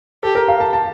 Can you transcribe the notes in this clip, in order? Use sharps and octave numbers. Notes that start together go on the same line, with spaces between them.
G4 A4
A#4
F5
A5
A5